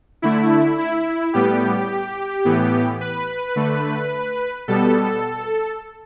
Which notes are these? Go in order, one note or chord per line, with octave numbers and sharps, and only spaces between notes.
D3 A3 E4
E4
A2 G3 B3 G4
A2 E3 B3
B4
D3 A3
B2 G3 B3 A4